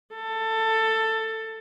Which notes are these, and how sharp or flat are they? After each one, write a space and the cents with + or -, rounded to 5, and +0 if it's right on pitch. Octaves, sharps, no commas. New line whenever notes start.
A4 +15